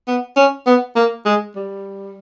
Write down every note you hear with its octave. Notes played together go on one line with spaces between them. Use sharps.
B3
C#4
B3
A#3
G#3
G3